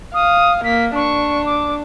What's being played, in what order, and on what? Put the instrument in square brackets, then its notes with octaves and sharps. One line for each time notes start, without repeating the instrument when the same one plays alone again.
[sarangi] F5 [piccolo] D#6
[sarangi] A#3 [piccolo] B6
[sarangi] D4 [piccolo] C#6
[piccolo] D6